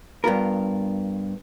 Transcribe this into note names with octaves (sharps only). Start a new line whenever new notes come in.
G2 B3 F4 A#4